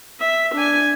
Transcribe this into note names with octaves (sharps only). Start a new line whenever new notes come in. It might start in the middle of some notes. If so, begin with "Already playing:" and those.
E5
D4 G#5